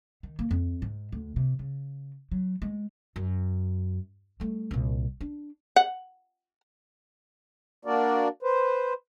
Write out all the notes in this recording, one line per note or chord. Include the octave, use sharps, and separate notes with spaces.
D#3
A#3
F2
G#2
D2
C3
C#3
F#3
G#3
F#2
G3 A3
C2 A#2
D4
F#5
A#3 D4 F#4 A#4 D5
B4 C5